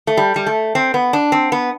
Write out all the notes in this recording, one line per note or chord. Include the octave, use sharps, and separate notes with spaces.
A3
G3
G3
A3
C4
B3
D4
C4
B3